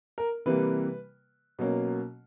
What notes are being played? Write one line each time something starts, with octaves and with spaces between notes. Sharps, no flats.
A#4
C3 E3 G3 A#3 B4
B2 F#3 A#3 C#4